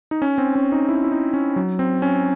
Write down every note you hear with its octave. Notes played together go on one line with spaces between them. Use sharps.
D#4
C#4
C4
C#4
D#4
E4
E4
D#4
C#4
F#3
C4
C#4